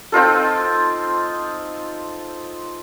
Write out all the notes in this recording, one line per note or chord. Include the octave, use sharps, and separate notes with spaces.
C4 D#4 F4 A4